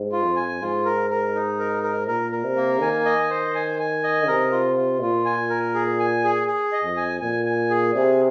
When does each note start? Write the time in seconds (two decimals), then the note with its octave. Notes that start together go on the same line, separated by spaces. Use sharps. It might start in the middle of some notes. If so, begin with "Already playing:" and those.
Already playing: G#2
0.12 F4
0.24 F2
0.36 G#5
0.61 G#2 F4
0.85 A#4
1.10 A#4
1.35 D#4
1.59 A#4
1.83 A#4
2.07 A#2 A#4
2.32 A#4
2.44 C3
2.56 A#3
2.82 D#3 G#5
3.05 D#5
3.30 C5
3.55 G#5
3.79 G#5
4.04 D#5
4.28 C3 A#4
4.52 F4
4.76 F4
5.01 A#2 F4
5.25 G#5
5.50 A#4
5.74 G#4
5.99 G#5
6.24 G#4
6.47 G#4
6.72 D#5
6.84 F2
6.97 G#5
7.21 A#2 G#5
7.46 G#5
7.70 G#4
7.95 C3 G#4